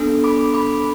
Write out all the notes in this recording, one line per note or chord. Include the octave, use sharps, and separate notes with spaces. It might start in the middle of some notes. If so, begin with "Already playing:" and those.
Already playing: B3 D4 A4
B5 D6
B5 D6